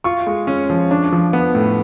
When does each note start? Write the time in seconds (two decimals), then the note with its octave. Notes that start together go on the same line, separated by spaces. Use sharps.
0.04 F4 C#6
0.27 G#3
0.47 C#4
0.70 F3
0.91 D4
1.12 F3
1.33 B3
1.55 A2